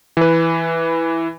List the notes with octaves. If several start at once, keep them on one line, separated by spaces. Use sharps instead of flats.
E3 B4